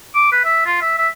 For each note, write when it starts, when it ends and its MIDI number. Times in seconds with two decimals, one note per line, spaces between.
0.15 0.31 86
0.32 0.41 71
0.45 0.64 76
0.66 0.78 65
0.82 0.96 76
0.98 1.08 76